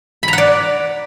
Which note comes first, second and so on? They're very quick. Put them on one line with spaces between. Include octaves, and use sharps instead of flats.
B5 A#5 F#5 D5